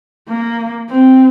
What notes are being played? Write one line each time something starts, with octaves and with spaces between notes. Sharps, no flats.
A#3
C4